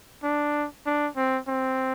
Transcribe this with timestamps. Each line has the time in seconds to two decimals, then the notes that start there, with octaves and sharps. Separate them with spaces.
0.23 D4
0.86 D4
1.16 C4
1.47 C4